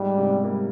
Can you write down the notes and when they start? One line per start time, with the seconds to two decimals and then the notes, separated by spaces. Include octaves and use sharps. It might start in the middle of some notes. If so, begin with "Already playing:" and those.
Already playing: G#2 G3
0.18 G#2 C3
0.44 G3 A#3